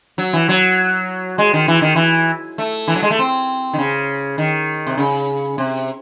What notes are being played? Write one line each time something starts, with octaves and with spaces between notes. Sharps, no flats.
F#3
E3
F#3
G#3
D#3
E3
D#3
E3
A3
E3
F#3
G#3
A3
C4
D#3
C#3
D#3
C3
C#3
C3